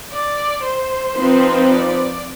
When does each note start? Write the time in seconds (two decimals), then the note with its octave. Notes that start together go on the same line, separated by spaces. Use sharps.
0.12 D5
0.64 C5
1.16 F3 C4 D#4 B4
1.69 D5